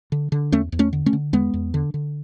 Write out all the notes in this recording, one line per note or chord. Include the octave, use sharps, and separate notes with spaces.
D3
D3
E2 A3 C#4
E2
A3 C#4
D3
A3 C#4
D3
E2 G#3 B3
E2
D3
D3